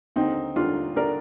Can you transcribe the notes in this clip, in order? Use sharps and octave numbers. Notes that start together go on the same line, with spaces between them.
D#2 D3 C4 D#4
D#2 D3 D4 F4
D3 A#4 D5